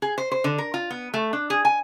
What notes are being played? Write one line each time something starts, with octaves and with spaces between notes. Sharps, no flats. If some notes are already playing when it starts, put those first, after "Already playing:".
G#4
C5
C5
D3
A#4
F4
B3
A3
D4
G#4
G#5